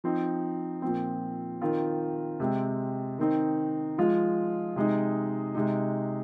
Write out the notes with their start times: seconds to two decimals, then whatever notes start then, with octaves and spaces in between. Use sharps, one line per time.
0.04 F3 C4 D#4
0.82 A#2 F3 C4
1.61 D#3 C4 F4
2.40 C3 G#3 C4
3.19 D#3 C4 D#4
3.98 F3 G#3 F4
4.76 C3 G#3 D#4
5.55 C3 G#3 D#4